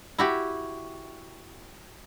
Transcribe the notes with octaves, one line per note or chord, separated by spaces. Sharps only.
E4 F#4 G4